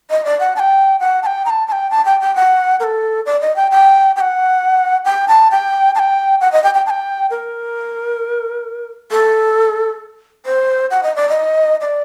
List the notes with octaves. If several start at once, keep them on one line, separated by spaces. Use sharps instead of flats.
D#5
D5
F#5
A5
G5
F#5
A5
G5
A#5
A5
A5
G5
A5
G5
G5
F#5
A#4
A4
D5
D#5
G5
G5
G5
F#5
G5
A5
G5
A5
G5
F#5
D#5
G5
G5
A5
G5
A#4
A4
C5
F#5
D#5
D5
D#5
D5